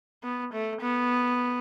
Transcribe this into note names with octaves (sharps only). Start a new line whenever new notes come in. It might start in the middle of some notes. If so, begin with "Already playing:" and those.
B3
A3
B3